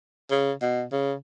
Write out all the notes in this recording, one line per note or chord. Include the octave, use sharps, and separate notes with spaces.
C#3
B2
C#3